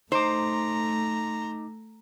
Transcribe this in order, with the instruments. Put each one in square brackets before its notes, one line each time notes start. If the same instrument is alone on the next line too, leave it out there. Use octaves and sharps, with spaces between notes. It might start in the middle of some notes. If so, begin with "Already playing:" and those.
[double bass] A3 [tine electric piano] D#4 D6 [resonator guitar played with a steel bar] C5 [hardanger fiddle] A#5